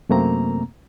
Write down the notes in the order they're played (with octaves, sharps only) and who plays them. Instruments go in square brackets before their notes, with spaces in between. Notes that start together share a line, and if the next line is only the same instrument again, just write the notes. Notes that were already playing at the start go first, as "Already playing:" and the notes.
[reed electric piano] F#2 C3 A3 A#3 C4 A#5